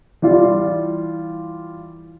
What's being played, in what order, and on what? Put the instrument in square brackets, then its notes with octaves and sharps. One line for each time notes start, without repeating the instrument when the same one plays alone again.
[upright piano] E3 G3 F4